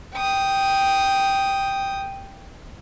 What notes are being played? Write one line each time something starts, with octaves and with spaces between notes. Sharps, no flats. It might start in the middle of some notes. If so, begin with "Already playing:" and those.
G5 D#6